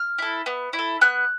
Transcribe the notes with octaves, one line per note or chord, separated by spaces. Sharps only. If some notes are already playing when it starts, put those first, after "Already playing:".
Already playing: F6
E4 A4
B3
E4
A4
B3 F#6